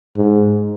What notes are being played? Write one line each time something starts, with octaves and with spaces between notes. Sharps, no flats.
G#2